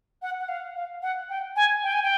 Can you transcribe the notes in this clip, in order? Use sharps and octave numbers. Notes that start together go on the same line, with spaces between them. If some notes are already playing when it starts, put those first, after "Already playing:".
F#5
F#5
F5
F5
F#5
G5
G#5
G5
G#5
G5